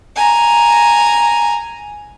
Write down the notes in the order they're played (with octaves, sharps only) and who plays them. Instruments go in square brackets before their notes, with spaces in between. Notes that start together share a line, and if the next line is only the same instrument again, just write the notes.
[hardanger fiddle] G#5 A#5